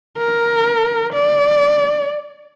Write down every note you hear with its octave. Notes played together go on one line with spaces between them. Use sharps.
A#4
D5